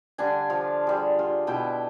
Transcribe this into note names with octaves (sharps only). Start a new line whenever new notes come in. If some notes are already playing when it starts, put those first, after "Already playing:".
D3 G3 D4 G#5
F3 F4 F5
G3 G#4
F4
B2 E4 G5 A5